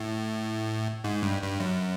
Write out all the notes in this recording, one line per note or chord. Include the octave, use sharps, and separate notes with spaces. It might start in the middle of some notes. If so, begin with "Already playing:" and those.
Already playing: A2
G#2
G2
G2
F#2